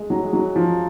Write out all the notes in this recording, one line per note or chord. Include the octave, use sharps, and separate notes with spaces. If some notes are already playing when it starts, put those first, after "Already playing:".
Already playing: G#3
F#3
G#3
F#3
F3